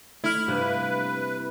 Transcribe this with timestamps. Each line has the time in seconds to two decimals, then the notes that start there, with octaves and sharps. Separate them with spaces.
0.24 A3 E4 F6
0.48 G2 C3 A#3 B4